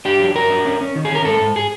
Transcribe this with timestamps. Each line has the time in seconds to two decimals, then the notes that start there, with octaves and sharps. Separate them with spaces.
0.05 D4 G4
0.20 F#3
0.35 F#3 A#4
0.50 D4
0.65 C#4
0.81 C#4
0.95 D#3
1.05 G#4
1.10 C#4 A#4
1.25 G#2 A4
1.41 G#2
1.56 G#4